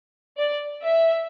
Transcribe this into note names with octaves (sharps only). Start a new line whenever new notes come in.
D5
E5